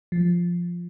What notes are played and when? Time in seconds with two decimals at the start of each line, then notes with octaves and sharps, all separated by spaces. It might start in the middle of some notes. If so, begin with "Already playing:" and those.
0.12 F3